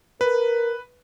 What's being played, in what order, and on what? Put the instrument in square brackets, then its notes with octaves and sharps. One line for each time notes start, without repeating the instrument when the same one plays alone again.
[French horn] A#4 [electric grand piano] B4